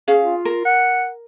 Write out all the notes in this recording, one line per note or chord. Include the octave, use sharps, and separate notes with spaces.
C#4 G#4 F5
F4
A#4
F#5